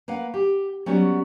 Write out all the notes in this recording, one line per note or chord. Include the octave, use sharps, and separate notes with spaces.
A#3 B4 F5 F#5
G4
F#3 G3 B3 C#4 F#4